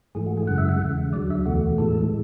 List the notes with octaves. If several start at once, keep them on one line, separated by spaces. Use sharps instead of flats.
G#2 E3 A3 G#4
F#4
G#4
F#2 C#3 G#3 F#5
E5
F#5
E2 C#3 G#3
D2 D3 F#3 D5
E5
E2 B2 A3 F#4
A2 E3 G#3 A4